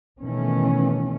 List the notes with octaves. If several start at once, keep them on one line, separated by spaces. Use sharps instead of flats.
B2 D#3 E3 A3 C#4